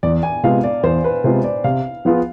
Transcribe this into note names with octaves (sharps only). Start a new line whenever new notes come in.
E2 D5
G#5
C3 G#3 B3 F4 F5
D5
E2 C5
B4
C3 G#3 B3 F4 C5
D5
C3 F5
F3 B3 F4 G#4